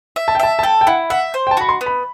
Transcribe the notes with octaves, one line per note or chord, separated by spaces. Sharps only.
E5
A5
G5
E5 A5
A5
A4 G5
G5
E4 F#5
E5 F#5
C5
G5
A5
F#4 B5
C6
B3
B5